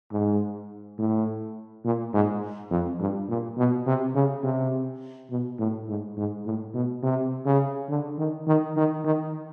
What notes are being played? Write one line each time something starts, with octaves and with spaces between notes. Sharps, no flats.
G#2
A2
A#2
G#2
F2
G2
A#2
B2
C3
C#3
C3
B2
A2
G#2
G#2
A2
B2
C3
C#3
D3
D#3
D#3
D#3
D#3